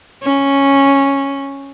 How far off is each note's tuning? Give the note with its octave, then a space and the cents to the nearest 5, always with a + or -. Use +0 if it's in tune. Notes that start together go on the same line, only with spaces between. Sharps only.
C#4 -5